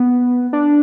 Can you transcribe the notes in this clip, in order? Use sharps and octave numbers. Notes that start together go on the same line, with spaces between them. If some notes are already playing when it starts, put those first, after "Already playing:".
Already playing: B3
D4